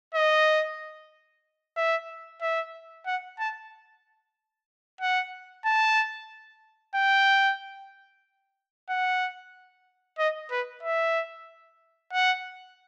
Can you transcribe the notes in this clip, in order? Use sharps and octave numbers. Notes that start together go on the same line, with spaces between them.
D#5
E5
E5
F#5
A5
F#5
A5
G5
F#5
D#5
B4
E5
F#5